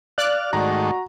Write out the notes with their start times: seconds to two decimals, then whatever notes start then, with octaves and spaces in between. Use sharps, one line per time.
0.18 D5 F5 F#6
0.53 G#2 D#3 A3 F#4 A#5